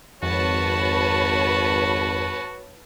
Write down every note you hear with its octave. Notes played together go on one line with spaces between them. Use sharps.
G#1 F2 F#4 B4 C#5 A5